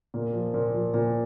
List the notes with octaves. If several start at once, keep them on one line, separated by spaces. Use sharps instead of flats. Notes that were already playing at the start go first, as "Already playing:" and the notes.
A#2 A#3
F3
A#2
F3
A#2